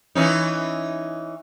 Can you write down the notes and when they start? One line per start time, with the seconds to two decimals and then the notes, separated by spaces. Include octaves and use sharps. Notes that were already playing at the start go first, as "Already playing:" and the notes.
0.15 E3 C#4 D#4